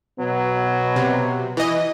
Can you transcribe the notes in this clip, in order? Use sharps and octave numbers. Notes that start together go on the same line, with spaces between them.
B2 F#3 B3
C3
E3 D#5